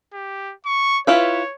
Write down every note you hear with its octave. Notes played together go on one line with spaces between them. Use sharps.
G4
C#6
E4 F4 B4 C#5